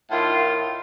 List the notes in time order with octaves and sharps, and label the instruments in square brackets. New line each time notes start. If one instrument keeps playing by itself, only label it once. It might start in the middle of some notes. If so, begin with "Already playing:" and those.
[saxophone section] A2 D#3 F4